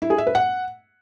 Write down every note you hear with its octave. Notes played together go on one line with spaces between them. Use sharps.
E4
G#4
E5
B4
F#5